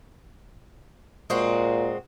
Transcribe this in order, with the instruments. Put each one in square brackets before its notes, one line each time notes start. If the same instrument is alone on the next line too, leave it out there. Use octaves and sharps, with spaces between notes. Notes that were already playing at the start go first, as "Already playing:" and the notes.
[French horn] A#2 [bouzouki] G#3 C4 F#4